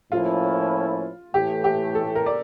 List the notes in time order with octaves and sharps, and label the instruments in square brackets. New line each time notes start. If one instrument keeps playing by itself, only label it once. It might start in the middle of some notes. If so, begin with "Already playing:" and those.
[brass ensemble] A2 F3 A#3 C#4 E4 [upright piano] F4
[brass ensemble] A2 E3 A3 [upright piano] G4
[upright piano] G4
A4
A#4
D5